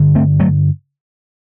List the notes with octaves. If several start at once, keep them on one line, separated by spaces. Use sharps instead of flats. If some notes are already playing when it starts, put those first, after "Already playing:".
Already playing: G2 D3
A3 C4
F#3 A3